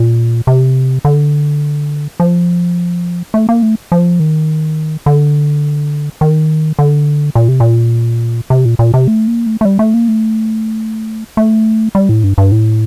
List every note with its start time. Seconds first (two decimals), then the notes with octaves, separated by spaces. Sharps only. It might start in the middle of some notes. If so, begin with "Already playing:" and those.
Already playing: A#2
0.47 C3
1.05 D3
2.20 F3
3.34 A3
3.49 A#3
3.62 A3
3.92 F3
4.20 D#3
5.06 D3
6.21 D#3
6.79 D3
7.35 A#2
7.48 C3
7.60 A#2
8.50 C3
8.65 A#2
8.79 A#2
8.94 C3
9.08 A3
9.27 A#3
9.46 A3
9.61 A3
9.65 G3
9.79 A3
9.94 A#3
10.08 A3
11.37 A3
11.95 G3
12.09 A2
12.24 G2
12.38 G2
12.52 A2